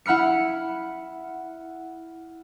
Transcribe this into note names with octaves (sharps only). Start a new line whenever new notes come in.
E4 F#5 B5 F6 C#7